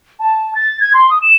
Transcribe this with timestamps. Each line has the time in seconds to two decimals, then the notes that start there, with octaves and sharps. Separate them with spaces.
0.19 A5
0.55 A6
0.80 G#6
0.94 C6
1.10 D#6
1.22 E7